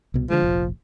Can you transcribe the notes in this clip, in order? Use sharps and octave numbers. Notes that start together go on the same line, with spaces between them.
C2 B2
D3 F3 G#3
F1 A#1